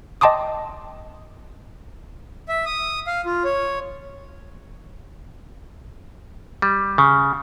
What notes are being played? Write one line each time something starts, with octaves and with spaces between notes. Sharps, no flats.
D#5 G5 A5 C6 D6 D#6
E5
D#6
F5
F4
C#5
G3
C#3